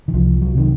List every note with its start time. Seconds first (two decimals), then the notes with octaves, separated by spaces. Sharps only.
0.08 D#3
0.13 C2 F3
0.41 F#3
0.55 C3 D#3